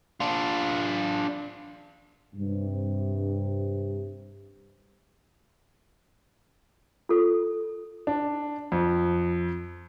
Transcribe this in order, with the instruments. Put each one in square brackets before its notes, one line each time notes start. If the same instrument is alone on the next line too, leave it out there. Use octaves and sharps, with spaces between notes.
[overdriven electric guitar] D4 F4
[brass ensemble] G2 C3
[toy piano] F4 A4
[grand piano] D4
F2